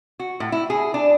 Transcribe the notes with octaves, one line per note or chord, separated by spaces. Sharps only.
F#4
A2
E4
G#4
D4